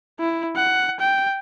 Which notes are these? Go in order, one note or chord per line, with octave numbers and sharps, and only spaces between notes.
E4
F#5
G5